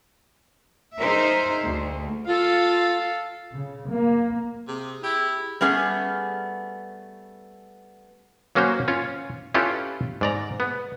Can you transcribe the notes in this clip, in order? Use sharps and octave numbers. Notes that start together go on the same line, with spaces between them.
D#4 G#4 A#4 C5 E5
D2
F4 A4 F5
C#3
A#3
C3 G#4
E4 G4
G3 A3 B3 C#4 G#4
F#3 A#3 C#4 F#4 C5
C#4 F4 C#5
C#4 E4 F4 G4 A4 B4
G#2 D5 A#5
B3